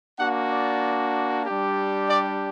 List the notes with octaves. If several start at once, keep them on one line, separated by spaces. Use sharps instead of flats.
A#3 D4 F#4 F#5
D5
G3 D4 G4
D5